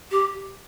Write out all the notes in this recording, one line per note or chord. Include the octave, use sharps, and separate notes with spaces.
G4